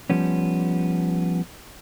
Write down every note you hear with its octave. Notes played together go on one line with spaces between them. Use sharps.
F3 G3 B3 C#4